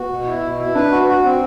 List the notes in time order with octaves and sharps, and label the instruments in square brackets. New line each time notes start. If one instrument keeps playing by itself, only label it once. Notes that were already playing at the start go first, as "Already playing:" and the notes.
Already playing: [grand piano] B3 [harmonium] F#4
[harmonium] B2
E4
B2
E4
[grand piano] D4 [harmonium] B4
[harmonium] F#4
F#4
C4